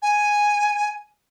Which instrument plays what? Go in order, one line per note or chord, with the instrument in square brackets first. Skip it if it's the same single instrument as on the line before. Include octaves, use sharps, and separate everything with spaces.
[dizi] G#5